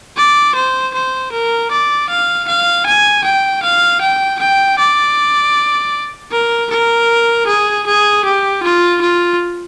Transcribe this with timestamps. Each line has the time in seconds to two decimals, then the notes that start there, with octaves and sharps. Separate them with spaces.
0.17 D5
0.55 C5
0.94 C5
1.32 A#4
1.71 D5
2.09 F5
2.48 F5
2.86 G#5
3.24 G5
3.63 F5
4.01 G5
4.39 G5
4.78 D5
6.32 A#4
6.71 A#4
7.47 G#4
7.86 G#4
8.25 G4
8.63 F4
9.01 F4